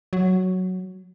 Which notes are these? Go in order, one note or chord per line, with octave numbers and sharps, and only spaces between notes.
F#3